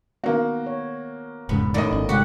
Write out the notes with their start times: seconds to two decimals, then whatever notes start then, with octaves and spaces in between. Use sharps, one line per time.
0.24 D#3 A#3 B3 F#4
0.67 C#5
1.49 E1 G#2 C#3 B3
1.74 F#2 A2 D#3 A3 D5 D#5
1.92 G1 C#4 D#4
2.09 C3 G#3 F#4 G4 F#5